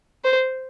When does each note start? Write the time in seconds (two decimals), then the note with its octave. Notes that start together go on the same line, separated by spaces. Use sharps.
0.24 C5